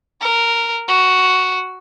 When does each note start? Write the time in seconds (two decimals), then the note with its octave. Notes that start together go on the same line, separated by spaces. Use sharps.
0.21 A#4
0.88 F#4